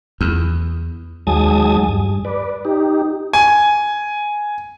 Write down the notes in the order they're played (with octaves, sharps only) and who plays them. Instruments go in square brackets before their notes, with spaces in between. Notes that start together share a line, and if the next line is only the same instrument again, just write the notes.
[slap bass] E2
[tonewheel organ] D#2 F#3 G#3 G#5 A5 D#6
G2
B4 D5
D#4 G4
[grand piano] G#5